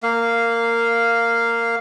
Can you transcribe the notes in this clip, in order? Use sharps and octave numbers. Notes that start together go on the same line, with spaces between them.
A#3 F5